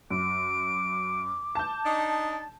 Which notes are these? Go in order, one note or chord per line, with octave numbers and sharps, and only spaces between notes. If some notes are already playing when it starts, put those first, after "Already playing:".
F#2 D6 D7
A5 G6
D4 D#4 A6